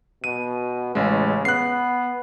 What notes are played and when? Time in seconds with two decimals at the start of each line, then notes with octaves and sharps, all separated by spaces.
0.24 B2 D#7
0.95 A1 C#3 G#3
1.45 B3 F#6 C7